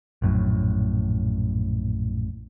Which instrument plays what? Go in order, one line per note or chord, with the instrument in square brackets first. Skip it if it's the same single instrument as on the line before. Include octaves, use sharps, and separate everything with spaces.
[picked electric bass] A#1 F#2 A2